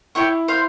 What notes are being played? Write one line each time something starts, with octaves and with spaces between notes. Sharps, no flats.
E4 G4 C#5 G5 C#6
C5 F5 C6